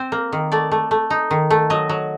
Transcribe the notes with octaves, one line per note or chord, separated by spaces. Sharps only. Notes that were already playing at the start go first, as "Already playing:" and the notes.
Already playing: C4 C5
A#3
D#3
A3 D5
A3
A3
D#4
D#3
A3
F#3 D#5
F#3